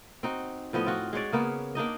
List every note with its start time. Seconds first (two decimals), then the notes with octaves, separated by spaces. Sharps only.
0.23 C4 D#4 F#4
0.73 A2 F3 B3 D#5
0.85 C4 F4 F#4
1.13 G#3 F#4 C#5 D5
1.32 C#3 A#3 B3
1.75 A#3 D4 D#4 D#5